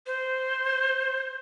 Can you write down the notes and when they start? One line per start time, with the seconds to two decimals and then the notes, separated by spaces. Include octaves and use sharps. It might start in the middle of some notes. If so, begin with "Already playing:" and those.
0.06 C5